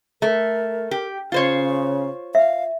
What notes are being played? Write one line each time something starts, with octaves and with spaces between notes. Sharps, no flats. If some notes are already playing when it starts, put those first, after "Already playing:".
A3 A#4
G4
C#3 F4 C5 C#5
E5 F5